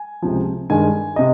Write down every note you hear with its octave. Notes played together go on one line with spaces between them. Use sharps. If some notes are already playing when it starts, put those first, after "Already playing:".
Already playing: G#5
C#2 C3 F3
G2 D#3 G#3 G#5
C3 D#5